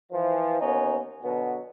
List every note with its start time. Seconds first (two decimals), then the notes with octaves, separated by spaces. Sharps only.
0.12 E3 F3
0.60 D#2 B3 C#4 D#4
1.23 B2 D3 F#3 B3